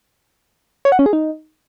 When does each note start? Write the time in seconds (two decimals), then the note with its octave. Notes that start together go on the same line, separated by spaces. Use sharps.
0.85 C#5
0.92 F#5
0.99 C#4
1.06 G#4
1.13 D#4